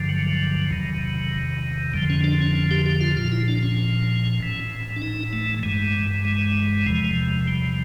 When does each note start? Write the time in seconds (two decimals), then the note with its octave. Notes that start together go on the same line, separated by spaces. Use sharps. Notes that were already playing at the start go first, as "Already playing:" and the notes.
Already playing: G2 D3 F3
0.09 F#3
0.71 E2 C3 D#3
1.94 F2 D3 F3 G3
2.10 C#4
2.24 D4
2.40 C#4
2.55 C#4
2.71 G4
2.86 G4
3.01 F4
3.17 A#2 F3 F4
3.32 E4
3.48 D4
3.63 C#4
4.40 A2 E3
4.96 D4
5.02 D#4
5.33 A3
5.63 G2 E3 G#3
6.25 G#3
6.87 E2 C3 F3
7.48 G3